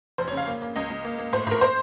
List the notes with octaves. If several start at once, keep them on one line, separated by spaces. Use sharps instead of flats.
F1 C5
C#5
C#3
F5
A#3
A#3
C#2 D#5
C#2
A#3
A#3
A2 C5
A2 A#4
C5